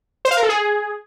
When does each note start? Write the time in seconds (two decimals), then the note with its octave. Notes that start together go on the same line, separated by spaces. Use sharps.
0.25 C5
0.31 F5
0.37 A#4
0.43 A4
0.49 G#4